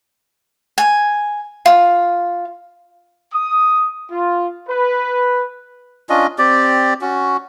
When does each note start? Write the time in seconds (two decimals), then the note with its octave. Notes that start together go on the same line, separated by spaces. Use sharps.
0.78 G#5
1.66 F4
3.33 D#6
4.11 F4
4.69 B4
6.09 C#4 D4 F4 D#5
6.38 C4 G4 D5
7.01 C#4 F#4